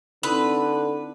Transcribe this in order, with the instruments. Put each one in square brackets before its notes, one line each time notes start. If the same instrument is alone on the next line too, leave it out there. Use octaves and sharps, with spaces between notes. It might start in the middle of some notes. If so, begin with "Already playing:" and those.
[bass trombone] D3 [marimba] C4 D#4 E4 [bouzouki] B4